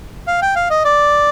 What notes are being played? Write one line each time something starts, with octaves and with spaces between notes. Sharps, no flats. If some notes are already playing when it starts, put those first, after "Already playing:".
F5
G5
F5
D#5
D5